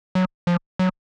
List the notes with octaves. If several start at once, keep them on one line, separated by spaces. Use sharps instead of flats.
F#3
F3
F#3